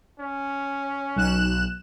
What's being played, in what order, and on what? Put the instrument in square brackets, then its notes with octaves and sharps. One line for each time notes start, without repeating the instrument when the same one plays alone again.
[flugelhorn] C#4
[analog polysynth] B1 F#6 E7